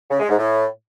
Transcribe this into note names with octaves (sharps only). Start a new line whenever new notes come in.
C#3
G#3
G#2
A2